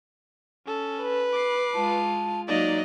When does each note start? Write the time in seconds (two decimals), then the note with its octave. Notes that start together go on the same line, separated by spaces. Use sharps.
0.66 C#4 A4
1.01 B4
1.32 D6 C7
1.74 G#3 F4 A5
2.48 F#3 A#3 D#4 D5 D#5